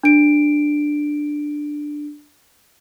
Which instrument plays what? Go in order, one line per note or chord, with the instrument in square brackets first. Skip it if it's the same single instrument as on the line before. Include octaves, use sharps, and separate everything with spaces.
[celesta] D4 D7